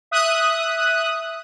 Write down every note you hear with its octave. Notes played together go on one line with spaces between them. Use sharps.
E5 D#6 F#6